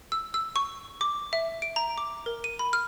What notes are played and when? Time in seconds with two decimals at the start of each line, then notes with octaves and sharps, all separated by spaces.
0.12 E6
0.34 E6
0.56 C#6
1.01 D6
1.33 E5
1.62 D7
1.76 A#5
1.98 D6
2.26 A#4
2.44 D#7
2.59 B5
2.73 F6